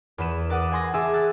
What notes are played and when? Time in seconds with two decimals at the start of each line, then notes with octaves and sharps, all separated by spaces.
0.18 E2 B4 E7
0.49 A#4 D5 F#5 D6 D#6
0.71 F#5 G#5 C6 A#6
0.94 G#4 E5 G#5 A5 D6 E6
1.13 E6 F#6 A6